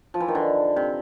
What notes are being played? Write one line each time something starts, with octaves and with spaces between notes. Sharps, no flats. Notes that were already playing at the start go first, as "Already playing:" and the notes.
F3
E3
D#3
D3
C3